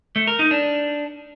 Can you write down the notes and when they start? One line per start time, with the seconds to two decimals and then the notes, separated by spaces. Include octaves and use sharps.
0.16 A3
0.27 A#4
0.39 D#4
0.51 D4